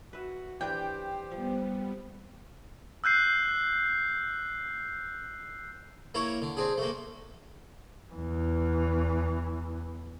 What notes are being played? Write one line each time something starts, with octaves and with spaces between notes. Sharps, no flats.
F#4 B4 E5
E3 D4 G4 B4 C5 G5
F3 G3 B3
E6 F#6 G6 C7
A#3 E4 A#4 C#5
D3
C4 D4 G#4
A3 A#3
E2 E3